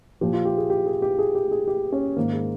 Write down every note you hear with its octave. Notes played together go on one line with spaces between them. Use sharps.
A#2 F3 G4
F4
G4
G#4
G4
G#4
G4
G#4
G4
G#4
G4
C#4
G#2 D#3 A#3
G#3